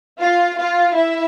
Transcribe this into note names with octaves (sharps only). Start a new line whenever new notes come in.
F4 F5
F4 F5
E4 E5